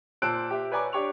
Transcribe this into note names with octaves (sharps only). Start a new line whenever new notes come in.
A#2 C5 A5 E6 F#6 D7
G4 E5
B4 C#5 D5 G#5 A#5 D6
D4 G4 C#5 C#6 F7